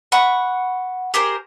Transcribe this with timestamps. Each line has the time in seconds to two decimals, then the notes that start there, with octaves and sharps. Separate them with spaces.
0.12 F#5 B5 C#6
1.14 G4 G#4 A#4 C5